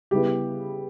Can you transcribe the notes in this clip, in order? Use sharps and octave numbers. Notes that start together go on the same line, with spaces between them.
C#3 G3 B3 E4 G4